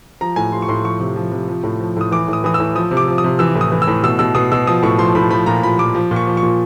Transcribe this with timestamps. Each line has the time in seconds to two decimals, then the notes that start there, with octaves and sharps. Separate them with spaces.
0.21 F3 A#5
0.36 A2 G#5
0.52 F3 C6
0.62 C#6
0.68 A2 C6
0.84 F3 C#6
1.00 C3
1.16 F3
1.32 C3
1.48 F3
1.64 A2
1.81 F3
1.96 A2 D#6
2.12 E3 D6
2.28 A2
2.33 D#6
2.44 E3 D#6
2.54 E6
2.60 A2
2.75 F3 D#6
2.91 C3
2.97 D6
3.08 F3
3.18 D#6
3.24 C3
3.39 E3 E6
3.55 A2
3.61 D#6
3.72 E3
3.82 E6
3.88 A2
4.03 B2 E6
4.19 B2 E6
4.35 B2 D#6
4.52 B2 E6
4.67 F3 D#6
4.83 A2 C#6
4.98 F3 C6
5.15 A2 B5
5.30 F3 B5
5.46 A#2 A#5
5.63 F3 B5
5.78 A#2 D6
5.95 F3
6.11 A#2
6.16 C#6
6.27 F3
6.37 C#6
6.43 A#2